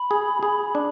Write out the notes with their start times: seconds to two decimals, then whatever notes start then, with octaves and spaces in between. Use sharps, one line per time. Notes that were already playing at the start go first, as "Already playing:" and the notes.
Already playing: B5
0.11 G#4
0.43 G#4
0.75 D4